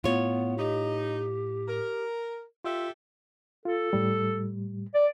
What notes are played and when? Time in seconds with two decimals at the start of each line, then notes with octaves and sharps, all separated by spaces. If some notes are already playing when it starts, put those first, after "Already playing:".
0.04 A2 B3 F4 C#5
0.58 D#4 G4
1.68 A#4
2.64 F4 G4 A4 E5
3.65 F4 A4
3.93 A2 G3
4.94 D5